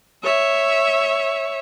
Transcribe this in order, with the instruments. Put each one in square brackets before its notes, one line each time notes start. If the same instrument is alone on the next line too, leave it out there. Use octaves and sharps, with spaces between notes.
[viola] C#5 E5